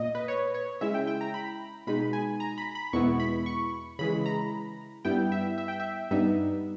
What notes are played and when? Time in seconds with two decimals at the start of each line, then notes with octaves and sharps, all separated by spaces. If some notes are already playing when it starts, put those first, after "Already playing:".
Already playing: A#2 A#3 D#5
0.15 B4
0.28 C#5
0.54 C#5
0.81 C#3 G#3 C#4 E4 E5
0.94 G5
1.07 G5
1.21 A#5
1.34 B5
1.87 B2 G#3 D#4 B5
2.13 G#5
2.40 A#5
2.58 B5
2.75 B5
2.93 E2 B2 G#3 B3 E4 C#6
3.20 B5
3.46 C#6
3.99 C#3 E3 G#3 B5
4.26 A#5
5.05 G2 G3 B3 E4 G5
5.32 E5
5.58 E5
5.68 G5
5.80 E5
6.11 G2 G3 B3 D#4 E5